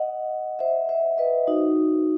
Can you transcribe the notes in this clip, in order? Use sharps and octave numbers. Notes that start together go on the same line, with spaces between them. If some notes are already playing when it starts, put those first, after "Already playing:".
Already playing: D#5 F#5
C5 E5
C5 E5
B4 D#5
D#4 F#4